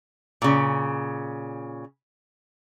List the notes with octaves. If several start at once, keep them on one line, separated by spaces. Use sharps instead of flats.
A#2 C#3